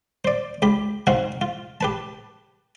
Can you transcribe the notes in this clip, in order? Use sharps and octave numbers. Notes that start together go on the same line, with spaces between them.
C5 D5
C#2 G4 B5
C4 D#4 F#4 F5 F#5
F4
G4 B4 A5